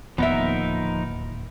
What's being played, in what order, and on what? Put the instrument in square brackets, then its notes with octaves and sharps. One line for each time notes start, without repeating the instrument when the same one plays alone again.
[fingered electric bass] D1 D#2 A#3 [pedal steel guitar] F3 D#4 A#4 [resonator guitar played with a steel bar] B3 E5